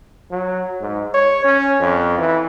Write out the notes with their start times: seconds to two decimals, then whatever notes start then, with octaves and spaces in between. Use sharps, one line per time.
0.31 F#3
0.81 G#2
1.14 C#5
1.44 C#4
1.80 F2
2.18 E3